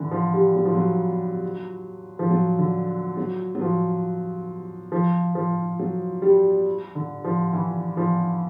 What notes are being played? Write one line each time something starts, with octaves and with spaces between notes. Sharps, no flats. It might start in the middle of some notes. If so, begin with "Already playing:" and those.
Already playing: D3 E3
F3
G3
F#3
F3
F#3
F3
F#3
D3
F#3
F#3
F3
F3
F3
F#3
G3
D3
F3
E3
F3